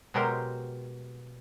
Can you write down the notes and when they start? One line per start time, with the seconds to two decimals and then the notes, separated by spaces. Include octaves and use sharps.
0.14 B2 F#3 G#3 G4 A#4 C5